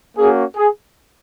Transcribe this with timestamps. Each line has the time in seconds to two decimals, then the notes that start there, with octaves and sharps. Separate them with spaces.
0.18 A#3 C#4 F#4 G#4
0.56 G#4